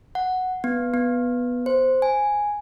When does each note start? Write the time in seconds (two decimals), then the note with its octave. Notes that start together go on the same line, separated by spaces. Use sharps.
0.15 F#5
0.64 B3
0.94 B3
1.66 C5
2.02 G#5